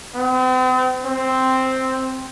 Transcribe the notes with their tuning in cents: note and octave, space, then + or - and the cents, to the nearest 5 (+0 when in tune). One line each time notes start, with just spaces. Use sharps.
C4 -40
C4 +0